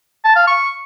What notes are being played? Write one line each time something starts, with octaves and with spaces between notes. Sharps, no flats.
A5
F5
C#6